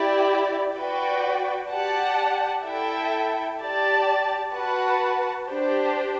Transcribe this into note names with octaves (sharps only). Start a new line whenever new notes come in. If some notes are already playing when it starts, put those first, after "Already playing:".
Already playing: E4 G4 D5
F#4 B4 D5 G5
G4 D5 F#5 A5
E4 A4 E5 G5
G4 D5 A5
F#4 B4 F#5 A5
D4 G4 C5